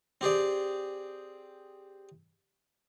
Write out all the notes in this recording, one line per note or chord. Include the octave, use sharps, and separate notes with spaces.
C4 G4 G#4 D5